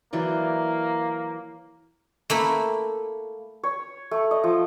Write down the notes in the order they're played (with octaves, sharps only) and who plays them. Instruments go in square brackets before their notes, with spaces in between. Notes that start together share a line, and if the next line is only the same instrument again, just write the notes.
[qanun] E3 F#3 D5 [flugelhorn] A#3
[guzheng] A3 A#3 E4
[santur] C#5
A3
D#5
F3